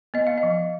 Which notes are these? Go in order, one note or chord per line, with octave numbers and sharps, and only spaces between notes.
B3 D#5
F5
D#5
F3